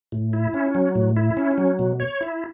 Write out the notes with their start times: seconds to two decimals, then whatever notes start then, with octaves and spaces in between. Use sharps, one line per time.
0.12 A2
0.33 E4
0.54 C#4
0.75 F#3
0.95 A2
1.16 E4
1.37 C#4
1.58 F#3
1.79 B2
2.00 C#5
2.21 E4